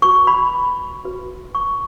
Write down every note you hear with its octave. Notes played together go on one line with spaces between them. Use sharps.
F#4 B4 C#6
B5
F#4 B4
C#6